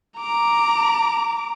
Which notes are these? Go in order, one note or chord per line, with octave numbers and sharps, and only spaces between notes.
A#5 D6